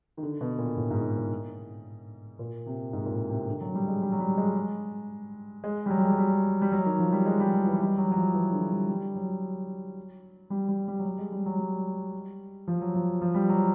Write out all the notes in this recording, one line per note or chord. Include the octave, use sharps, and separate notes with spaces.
D#3
D3
B2
A#2
A2
G#2
A#2
A#2
C3
G#2
A#2
A2
C3
D3
F#3
G3
G#3
G3
F#3
G3
G#3
G#3
G3
F#3
G3
G#3
F#3
G3
G3
F#3
D#3
F3
G3
G#3
G3
F#3
E3
G3
F#3
F#3
F3
E3
D3
G3
G3
F#3
G3
G3
G3
F#3
G3
G#3
G3
F#3
G3
F3
F#3
F3
F3
G3
F#3